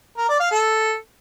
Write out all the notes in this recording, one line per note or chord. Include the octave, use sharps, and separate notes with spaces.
A#4
D5
F5
A4